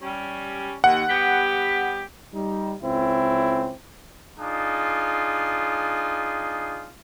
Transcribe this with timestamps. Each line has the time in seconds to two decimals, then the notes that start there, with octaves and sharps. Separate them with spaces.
0.01 G3 C#4
0.84 D#2 F#5
1.08 G3 B3 G4
2.33 G3 D#4
2.82 C#2 C4 C#4 E4
4.40 D4 D#4 F4 G#4